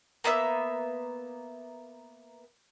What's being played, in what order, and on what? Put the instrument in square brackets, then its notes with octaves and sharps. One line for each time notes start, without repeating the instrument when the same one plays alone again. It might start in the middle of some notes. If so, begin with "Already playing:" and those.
[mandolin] A#3 B3 E5 E6